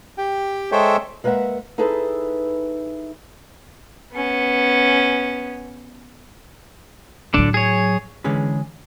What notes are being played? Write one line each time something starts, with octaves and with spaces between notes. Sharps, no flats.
G4 G5
G#3 A4 C5 C#5 E5 G5
G#3 A#3 B4 D#5 E5 F#5
D#4 E4 G#4 A4 B4
B3 C#4
A2 D3 F#3 D4
G#4 C#5
D3 E3 G#3 C#4 G#4 B4